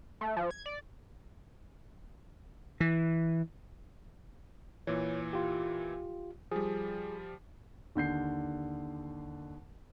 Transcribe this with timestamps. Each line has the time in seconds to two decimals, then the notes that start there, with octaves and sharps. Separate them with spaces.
0.21 A3
0.36 F3
0.51 G#6
0.66 D5
2.80 E3
4.87 A#2 E3 C#5
5.33 F4 G4
6.52 F3 G3 G#4
7.95 D#2 D3 G6 C7